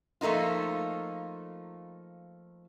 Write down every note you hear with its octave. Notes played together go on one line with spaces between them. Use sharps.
F3 A3 A#3 D#4 F4